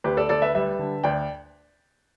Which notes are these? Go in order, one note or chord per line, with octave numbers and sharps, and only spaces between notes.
D2 G4 B4
A4 D5
D2 A4 D5
B4 E5
G3 B4 E5
D3
D2 D5 G5